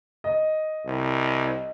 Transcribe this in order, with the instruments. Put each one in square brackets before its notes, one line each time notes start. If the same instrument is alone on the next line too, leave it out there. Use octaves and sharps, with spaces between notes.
[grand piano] D#5
[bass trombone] C2